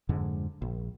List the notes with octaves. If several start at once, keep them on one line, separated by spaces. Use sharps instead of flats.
F2 G#2 D3 G#3
A#1